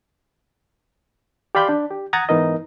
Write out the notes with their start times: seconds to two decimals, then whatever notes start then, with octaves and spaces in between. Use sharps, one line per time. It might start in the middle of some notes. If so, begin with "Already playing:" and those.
1.55 G4 D5 F5 B5 C6 G6
1.69 D4
1.90 G4
2.13 F#5 A#5 D#6 G#6 A6
2.29 G#2 E3 B3 D#4 A#4 D#5